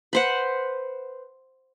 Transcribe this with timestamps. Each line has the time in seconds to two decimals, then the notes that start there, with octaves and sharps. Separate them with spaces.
0.13 B4 C5 F#5